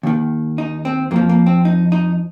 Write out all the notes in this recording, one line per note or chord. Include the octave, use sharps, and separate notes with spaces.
D#2 D#3
D#4
C4
F2 F3 A#3
A#3
C4
D#4
D#4